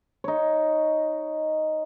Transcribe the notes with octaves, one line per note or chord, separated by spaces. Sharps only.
D#4 C#5